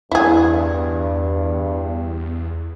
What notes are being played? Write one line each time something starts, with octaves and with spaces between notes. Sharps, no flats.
E2 G2 E4 G#4